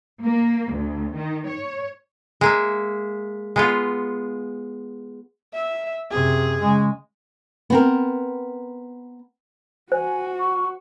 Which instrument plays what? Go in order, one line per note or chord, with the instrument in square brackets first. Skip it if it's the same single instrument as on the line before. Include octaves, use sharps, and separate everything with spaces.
[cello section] A#3
D2
D#3
C#5
[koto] G#3 A#3 E5
G#3 B3 F4
[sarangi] E5
[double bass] F#2 C3 [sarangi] G#4
[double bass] C#3 G#3
[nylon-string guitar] B3 C4 A#4
[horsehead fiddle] F#4 [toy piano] C5 [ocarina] G#5
[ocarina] C#6